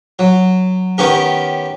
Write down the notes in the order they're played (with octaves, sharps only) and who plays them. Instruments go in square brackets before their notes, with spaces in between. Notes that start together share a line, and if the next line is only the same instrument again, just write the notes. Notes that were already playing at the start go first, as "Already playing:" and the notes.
[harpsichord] F#3
D#3 B3 C#4 G4 A#4